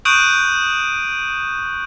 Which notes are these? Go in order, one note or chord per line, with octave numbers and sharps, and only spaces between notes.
C#6 D#6 F#6 G6 D7 D#7